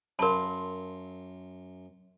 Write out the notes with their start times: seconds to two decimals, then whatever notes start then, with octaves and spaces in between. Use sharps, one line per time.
0.19 F#2 A#4 F5 A5 B5 C6